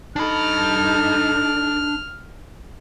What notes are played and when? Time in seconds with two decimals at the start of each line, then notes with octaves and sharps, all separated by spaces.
0.16 D4 D#4 A4 B5 F6